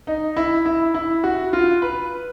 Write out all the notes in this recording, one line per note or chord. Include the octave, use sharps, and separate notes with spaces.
D#4
E4
E4
E4
F#4
F4
B4